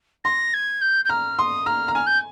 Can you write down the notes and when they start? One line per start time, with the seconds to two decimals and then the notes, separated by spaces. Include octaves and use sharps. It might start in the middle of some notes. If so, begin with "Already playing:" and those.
0.24 C6 A#6
0.54 G#6
0.81 G6
1.05 G6
1.09 A#5 F6
1.39 C6 D#6
1.66 A#5 F6
1.88 A#5
1.95 G#5 F6
2.06 G6